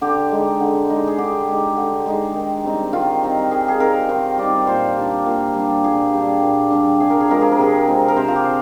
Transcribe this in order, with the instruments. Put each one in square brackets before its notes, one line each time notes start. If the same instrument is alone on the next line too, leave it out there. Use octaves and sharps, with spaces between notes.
[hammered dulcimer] D3 G4
G#3 D#4
D3
G#3 D#4
G#4
D3 G4
G#3 D#4
D3
G#3 D#4
D#3
G3 C4 D#4
D#3 F4
G3 C4 D#4
D#3 G#4
G#4
G3 C4 D#4 A#4
D#3 C5
G3 C4 D#4 D5
A#2 C5
G3 D4
A#2
G3
D4
A#2 G#4
G3 D4
A#2
G3 D4
C3 G#4
A#4
G#4
F3 G#3 C4 A#4
G#4
A#4
C3 G#4
F3 G#3 C4
A#4
C3 C5
F4
G4
F3